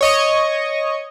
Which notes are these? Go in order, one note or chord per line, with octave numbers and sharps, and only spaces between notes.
C#5 D#5 C#6